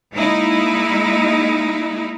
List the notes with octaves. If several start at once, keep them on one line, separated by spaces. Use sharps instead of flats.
G#3 A#3 D#4 E4